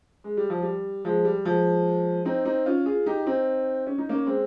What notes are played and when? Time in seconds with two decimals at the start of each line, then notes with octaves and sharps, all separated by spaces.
0.24 G#3
0.37 G3
0.50 F3
0.62 G3
1.05 F3 G#3
1.25 G3
1.45 F3 G#3
2.25 C4 D#4
2.45 C4 D#4
2.66 C#4 F4
2.86 F4 G#4
3.06 D#4 G4
3.26 C4 D#4
3.87 C#4
3.98 D#4
4.09 A#3 C#4
4.27 G#3 C4